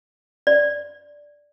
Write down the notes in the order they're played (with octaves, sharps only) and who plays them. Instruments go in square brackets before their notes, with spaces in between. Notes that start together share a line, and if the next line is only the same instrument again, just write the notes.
[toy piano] D5